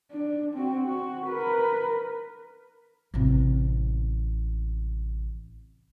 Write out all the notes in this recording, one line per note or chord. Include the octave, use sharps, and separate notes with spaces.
D4
C4 F#4
F#4
A#4 B4
A1 C3